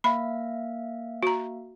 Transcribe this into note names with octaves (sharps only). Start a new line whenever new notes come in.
A#3 E5 F5 B5
F#4 A#5